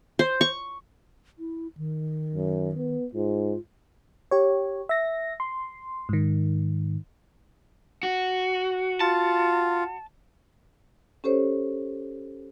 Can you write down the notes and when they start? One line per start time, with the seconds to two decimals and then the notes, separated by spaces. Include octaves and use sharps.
0.19 C5
0.41 C#6
1.39 E4
1.77 D#3
2.35 F#2
2.75 B3
3.14 G#2 F4
4.31 G4 C#5
4.89 E5 A#6
5.40 C6
6.09 G#2 D#3
8.03 F#4
9.00 F4 A5
11.24 C#4 G4 A4 C5 C#5